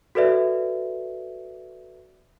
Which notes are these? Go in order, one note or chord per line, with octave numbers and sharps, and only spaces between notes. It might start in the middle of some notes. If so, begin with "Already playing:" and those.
F#4 A4 B4 D5 E5